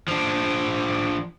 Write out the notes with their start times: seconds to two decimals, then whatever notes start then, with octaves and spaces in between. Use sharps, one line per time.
0.08 F3 D4